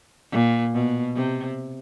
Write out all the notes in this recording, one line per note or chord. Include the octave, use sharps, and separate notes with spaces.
A#2
B2
C3